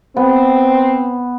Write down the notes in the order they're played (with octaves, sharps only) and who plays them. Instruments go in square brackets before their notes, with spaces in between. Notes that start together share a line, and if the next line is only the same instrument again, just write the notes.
[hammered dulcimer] B3 [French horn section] C4